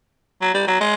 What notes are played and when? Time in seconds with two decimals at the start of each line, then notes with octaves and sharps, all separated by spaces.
0.41 F#3
0.54 G3
0.67 F#3
0.80 G#3